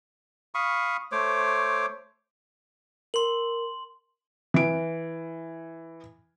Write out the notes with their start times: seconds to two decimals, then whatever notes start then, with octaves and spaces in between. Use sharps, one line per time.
0.55 F5 B5 C#6 D#6
1.12 A3 C5 C#5 D6
3.14 A#4 C6 F#7
4.54 E3 D7